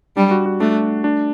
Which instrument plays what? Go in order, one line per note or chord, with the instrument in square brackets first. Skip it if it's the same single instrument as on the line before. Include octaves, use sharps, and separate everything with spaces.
[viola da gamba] G3 [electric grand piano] D4
[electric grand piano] F#4
F#4
[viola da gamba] A3 [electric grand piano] D4
[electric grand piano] D4